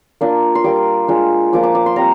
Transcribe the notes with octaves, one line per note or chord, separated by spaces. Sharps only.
A#3 D4 F4
C6
G3 A#3 F4 D6
G#3 D4 F4
F3 A#3 F4 D6
D6
D6
C6
G3 C4 A#5